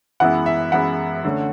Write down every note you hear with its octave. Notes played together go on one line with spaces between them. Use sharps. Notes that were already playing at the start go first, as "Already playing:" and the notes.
F#2 E3 G#3 B3 E4 F#5
E5
F#2 E3 G#3 B3 E4 F#5
D3 A3 C#4